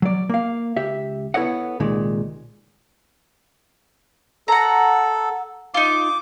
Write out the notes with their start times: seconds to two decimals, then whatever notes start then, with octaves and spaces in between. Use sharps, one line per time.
0.02 F#3 D5
0.29 A#3 F5
0.77 C#2 G4 E5
1.34 B3 E4 A4 C#5 D#5 F#5
1.80 C2 A#2 D#3 G#3
4.48 A4 F#5 A#5
5.74 D#4 F4 D6